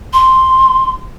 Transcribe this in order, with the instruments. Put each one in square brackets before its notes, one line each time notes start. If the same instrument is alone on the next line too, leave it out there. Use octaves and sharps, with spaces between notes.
[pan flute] C6